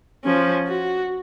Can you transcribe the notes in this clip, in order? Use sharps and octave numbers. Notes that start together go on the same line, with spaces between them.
F3 C#4
F#4